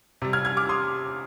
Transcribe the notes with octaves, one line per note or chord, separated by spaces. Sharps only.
C3 G3
F6 G#6
F6 G#6
D6 F6
C6 D#6